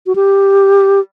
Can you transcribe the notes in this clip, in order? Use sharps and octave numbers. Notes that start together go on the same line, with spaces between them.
F#4
G4